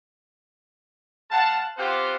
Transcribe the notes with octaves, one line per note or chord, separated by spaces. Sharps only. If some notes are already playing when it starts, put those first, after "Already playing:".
G#3 F5 F#5 A5
B3 C4 F4 G4 C5 F#5